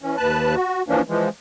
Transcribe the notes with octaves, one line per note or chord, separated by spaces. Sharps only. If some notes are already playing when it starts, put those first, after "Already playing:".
E3 C#4
D#2 B4 A5 F#6
F#4
E3 F3 A#3 C#4 D4
E3 F3 G#3